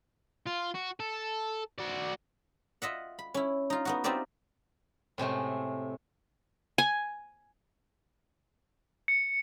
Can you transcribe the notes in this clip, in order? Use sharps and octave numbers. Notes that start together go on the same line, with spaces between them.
F4
F#4
A4
F#4 D5
F4 D#5 E5 F#5
B5
C#4 E4
D#4 F4
B3 D#4 F#4
C4 D#4 F4 G4 D5 E5
A2 C3 G#3 A3
G#5
C#7